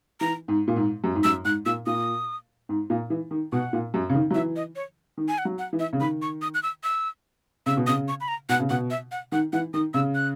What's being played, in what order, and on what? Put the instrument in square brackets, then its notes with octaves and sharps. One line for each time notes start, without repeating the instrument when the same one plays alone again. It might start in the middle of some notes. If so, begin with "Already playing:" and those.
[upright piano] E3 [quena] A#5
[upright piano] G#2
A#2
G#2
F#2
G#2
[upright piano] F#2 [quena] E6
[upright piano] G#2 [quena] F#6
[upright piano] A#2 [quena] E6
[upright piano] A#2 [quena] D#6
[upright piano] G#2
A#2
E3
D#3
[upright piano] B2 [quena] F#5
[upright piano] A#2
F#2
C#3
D#3
F#3
[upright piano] E3 [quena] E5
[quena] D#5
C#5
[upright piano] D#3
[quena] G#5
F#5
[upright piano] F#3
[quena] F#5
[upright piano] E3
[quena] E5
[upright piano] C#3
[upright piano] D#3 [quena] B5
[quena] C#6
D#6
F#6
E6
E6
[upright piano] C#3 [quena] E6
[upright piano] B2
[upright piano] C#3 [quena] D#6
[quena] C#6
B5
A#5
[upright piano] B2 [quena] F#5
[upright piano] C#3
[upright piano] B2 [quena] F#5
[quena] E5
F#5
[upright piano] D#3 [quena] F#5
[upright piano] E3 [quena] F#5
[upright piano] D#3 [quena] D#6
[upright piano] C#3 [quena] E6
[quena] F#6